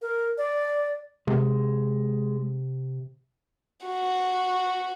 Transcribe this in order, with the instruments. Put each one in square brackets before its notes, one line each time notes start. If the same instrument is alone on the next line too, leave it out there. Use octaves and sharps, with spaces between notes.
[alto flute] A#4
D5
[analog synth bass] C3 [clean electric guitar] G#3
[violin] F#4